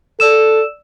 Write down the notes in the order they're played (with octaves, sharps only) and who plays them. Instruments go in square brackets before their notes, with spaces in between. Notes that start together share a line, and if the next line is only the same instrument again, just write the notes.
[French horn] A4 [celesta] D5 E6 E7